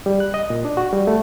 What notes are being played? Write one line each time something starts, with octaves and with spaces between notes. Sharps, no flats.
G3
F#6
D#5
A#2
D4
F#4
G3
A3